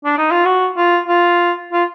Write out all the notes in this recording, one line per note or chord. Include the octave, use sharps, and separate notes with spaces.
D4
D#4
F4
F#4
F4
F4
F4